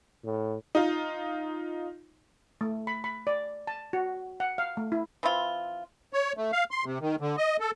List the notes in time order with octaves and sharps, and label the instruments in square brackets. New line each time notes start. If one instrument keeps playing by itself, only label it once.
[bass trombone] A2
[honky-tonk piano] D#4 F4
[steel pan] A3
B5
B5
D5
A5
F#4
F#5
F5
A3
E4
[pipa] E3 C4 E4 F4
[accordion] C#5
A3
F5
C6
C3
D#3
D3
D#5
A4